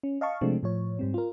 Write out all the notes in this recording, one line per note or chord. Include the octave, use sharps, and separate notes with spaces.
C#4
D#5 F5 A5 C#6
C3 F3 G#3 A3 C4 D4
A2 F3 C#5
G#2 G3 C4
F4 A#4